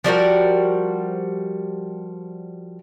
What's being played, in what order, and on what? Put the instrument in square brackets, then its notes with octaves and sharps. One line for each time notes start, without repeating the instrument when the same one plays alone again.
[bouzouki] F3 G3 F#4 A#4